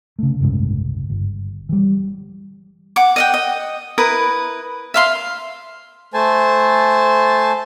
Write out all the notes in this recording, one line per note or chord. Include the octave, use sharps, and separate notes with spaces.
C#3 A3
F#1 C2 G#2 C#3
G1
E3 G3
F#5 D6
D#5 F#5 G5
D#5
E4 A#4 B4 D#6
E5 F5 C6
A3 C5 G#5 A5